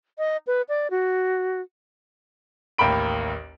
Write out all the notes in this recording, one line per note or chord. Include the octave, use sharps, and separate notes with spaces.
D#5
B4
D5
F#4
A1 D#2 A#3 G5 B5 D7